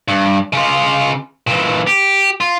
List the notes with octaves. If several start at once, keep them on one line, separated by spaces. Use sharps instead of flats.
G2
C#3 F4
A#2 E3
G4
F4